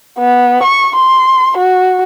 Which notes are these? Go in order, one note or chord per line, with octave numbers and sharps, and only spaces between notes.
B3
C#6
C6
F#4